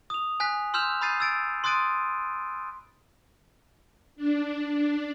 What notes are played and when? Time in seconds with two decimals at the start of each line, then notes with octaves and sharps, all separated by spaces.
0.10 D#6 F7
0.40 G#5 F#6 B6
0.74 C6 E6 F6 G6 E7 F7
1.01 B5 D#6 G6 A6 C7 D#7
1.20 E6 G#6 A6 D7
1.64 C6 D#6 F#6 A6 D7 D#7
4.16 D4
4.69 D4